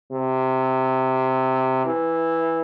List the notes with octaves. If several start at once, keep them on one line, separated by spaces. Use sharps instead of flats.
C3
E3